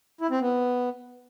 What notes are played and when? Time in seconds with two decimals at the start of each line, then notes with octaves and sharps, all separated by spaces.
0.21 E4
0.31 C4
0.40 B3